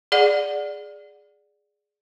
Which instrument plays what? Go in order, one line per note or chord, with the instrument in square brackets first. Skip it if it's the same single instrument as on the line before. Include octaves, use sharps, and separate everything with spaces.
[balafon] G#4 D5 F#5